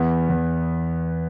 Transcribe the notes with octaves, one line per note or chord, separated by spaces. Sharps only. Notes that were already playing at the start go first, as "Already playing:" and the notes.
Already playing: E2 B3
E2